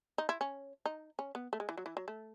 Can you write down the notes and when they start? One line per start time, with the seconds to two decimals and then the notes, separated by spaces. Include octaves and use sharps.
0.18 D#4
0.29 E4
0.41 C#4
0.85 D#4
1.19 C#4
1.35 B3
1.53 A3
1.60 G#3
1.69 E3
1.77 F#3
1.86 E3
1.97 F#3
2.08 A3